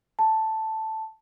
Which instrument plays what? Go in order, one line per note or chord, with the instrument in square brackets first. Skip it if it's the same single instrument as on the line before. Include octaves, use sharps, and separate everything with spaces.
[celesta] A5